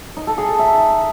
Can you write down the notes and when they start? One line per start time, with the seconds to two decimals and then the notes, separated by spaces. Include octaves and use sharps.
0.17 D#4
0.27 A4
0.38 G#4
0.48 A4
0.59 E5